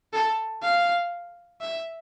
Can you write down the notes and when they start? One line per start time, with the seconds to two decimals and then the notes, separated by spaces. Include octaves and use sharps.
0.13 A4
0.62 F5
1.61 E5